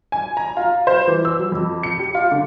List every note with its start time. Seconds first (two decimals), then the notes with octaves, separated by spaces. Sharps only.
0.12 G#5
0.37 A#5
0.57 F4
0.87 C5
1.07 E3
1.25 E6
1.39 F#3
1.52 F2
1.83 C#7
1.99 G4
2.15 F4
2.31 D3